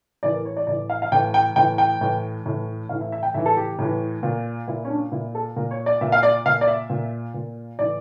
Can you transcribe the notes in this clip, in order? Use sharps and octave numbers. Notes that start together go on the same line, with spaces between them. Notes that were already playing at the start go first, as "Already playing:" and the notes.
A2 E3 D5
A#4
C#5
D5
A2 E3 D5
F5
F5
A2 E3 G5
G5
A2 E3 G5
G5
A2 E3
A2 E3
A2 E3 F5
E5
E5
G5
A2 E3 E5
A4
G4
A2 E3
A#2
A#2 E4
C#4
D4
A#2 E4
A4
A#2 A#4
C#5
D5
A#2 E5
F5
D5
A#2 F5
D5
E5
A#2
A#2
A2 E3 D5